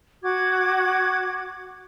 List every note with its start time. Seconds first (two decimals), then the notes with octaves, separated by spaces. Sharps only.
0.23 F#4 D6 G#6